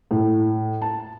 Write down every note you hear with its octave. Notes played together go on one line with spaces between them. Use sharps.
A2
A5